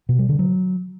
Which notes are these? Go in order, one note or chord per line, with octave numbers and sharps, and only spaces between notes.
B2
G3
D3
F#3